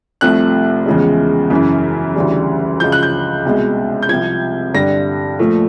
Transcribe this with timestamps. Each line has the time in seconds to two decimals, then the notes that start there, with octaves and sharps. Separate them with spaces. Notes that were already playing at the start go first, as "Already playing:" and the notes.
0.21 C2 C3 F3 A3 F#6
0.86 E2 C#3 F3 G#3
1.50 F#2 C#3 E3
2.16 D2 C#3 E3 G3
2.80 C#2 C#3 F3 G6
2.92 F#6
3.03 G6
3.45 C2 B2 G#3
4.03 G6
4.09 C2 C3 F3 G#6
4.74 G2 D3 G3 A#6
5.39 A#2 F3 A3